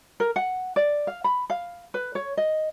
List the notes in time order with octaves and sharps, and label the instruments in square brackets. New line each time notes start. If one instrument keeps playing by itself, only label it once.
[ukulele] A#4
F#5
D5
F5
B5
F5
B4
C#5
D#5